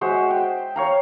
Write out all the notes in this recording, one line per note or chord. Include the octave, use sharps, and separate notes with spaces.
G#3 F#4 C5 E5
G5
C#5 F5 A#5